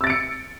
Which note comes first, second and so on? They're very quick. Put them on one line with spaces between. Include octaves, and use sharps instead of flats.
E6 A6 D7 C#7